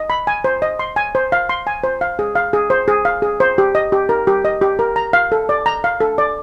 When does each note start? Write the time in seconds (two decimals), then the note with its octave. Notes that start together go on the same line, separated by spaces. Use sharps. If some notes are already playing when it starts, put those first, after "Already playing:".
Already playing: D#5
0.10 B5
0.27 G#5
0.44 C5
0.62 D#5
0.79 C6
0.96 G#5
1.15 C5
1.32 F5
1.49 C6
1.67 G#5
1.84 C5
2.01 F5
2.19 G#4
2.35 F5
2.53 G#4
2.70 C5
2.88 G#4
3.05 F5
3.22 G#4
3.40 C5
3.58 G4
3.75 D#5
3.92 G4
4.09 A#4
4.27 G4
4.45 D#5
4.62 G4
4.79 A#4
4.96 A#5
5.13 F5
5.32 A4
5.49 D5
5.66 A#5
5.84 F5
6.00 A4
6.18 D5